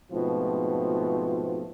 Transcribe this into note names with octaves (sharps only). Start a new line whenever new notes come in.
G#2 B2 F3 A3 C4 F4